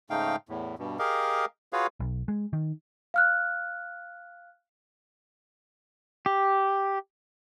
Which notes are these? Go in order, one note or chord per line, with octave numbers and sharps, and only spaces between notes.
G#2 C#3 A3 D#4 F5 G5
E2 A2
G2 B2
G4 G#4 A#4 D#5 F5
F4 F#4 G#4 B4 C#5 F5
B1
G#3
D#3
F5 F6 F#6
G4